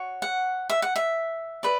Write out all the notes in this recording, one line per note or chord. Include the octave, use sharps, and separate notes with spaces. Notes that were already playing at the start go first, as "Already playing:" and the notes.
Already playing: F#4 C#5
F#5
E5
F#5
E5
B4 D5